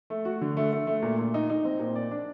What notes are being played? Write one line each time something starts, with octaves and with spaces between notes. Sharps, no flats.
A3
F#4
D3
A3
A3
A3
A#2
A#2
D#4
D#4
C4
A#2
D5
D4